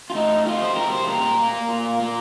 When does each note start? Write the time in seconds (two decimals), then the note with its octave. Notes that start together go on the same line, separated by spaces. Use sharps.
0.10 F4
0.15 A3 D#4
0.45 G3 F4
0.61 C5
0.76 G3 A#4
0.92 C5
1.07 A#2 A#4
1.38 A#3
1.69 A#2
2.00 A#3